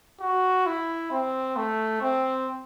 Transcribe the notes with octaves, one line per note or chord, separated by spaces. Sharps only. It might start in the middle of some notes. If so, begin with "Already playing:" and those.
F#4
E4
C4
A3
C4